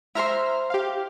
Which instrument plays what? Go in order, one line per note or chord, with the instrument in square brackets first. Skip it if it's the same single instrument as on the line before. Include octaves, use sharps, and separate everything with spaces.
[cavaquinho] E4 C5 C6 [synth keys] E5 A#5 F6
[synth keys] G4 F5